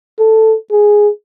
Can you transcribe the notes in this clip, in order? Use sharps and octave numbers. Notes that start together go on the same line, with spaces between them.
A4
G#4